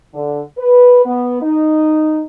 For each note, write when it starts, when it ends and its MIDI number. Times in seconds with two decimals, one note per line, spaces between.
0.14 0.41 50
0.57 1.01 71
1.06 1.40 59
1.42 2.22 63